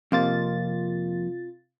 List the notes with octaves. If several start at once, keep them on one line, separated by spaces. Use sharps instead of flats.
F2 C3 A#3 F4 A6